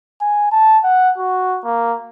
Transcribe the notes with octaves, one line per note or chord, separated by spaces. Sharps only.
G#5
A5
F#5
F#4
A#3